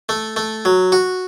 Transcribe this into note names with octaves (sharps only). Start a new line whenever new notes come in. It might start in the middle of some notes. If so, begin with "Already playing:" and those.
A3
A3
F#3
F#4